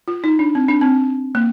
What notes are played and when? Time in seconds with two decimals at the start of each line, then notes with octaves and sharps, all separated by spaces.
0.08 F4
0.24 D#4
0.39 D4
0.55 C4
0.68 D4
0.81 C4
1.35 A#3